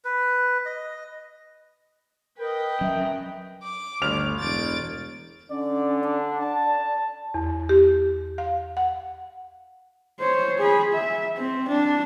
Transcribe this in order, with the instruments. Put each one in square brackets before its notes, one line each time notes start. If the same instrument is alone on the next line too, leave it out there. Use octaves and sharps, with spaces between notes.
[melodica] B4
D#5
[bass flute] A#4 [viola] B4 D#5 [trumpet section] G5
[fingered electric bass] F#3 C#4 [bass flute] E5
[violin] D6
[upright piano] G1 F6 F7 [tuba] D2
[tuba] E1 [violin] A6 D7
[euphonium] D3 [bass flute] C#4 [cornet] D5
[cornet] D4 [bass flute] D5
[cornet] A5
[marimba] E2
G4
F5
F#5
[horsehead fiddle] C5 C#5
G#4 B5
E5
C4
D4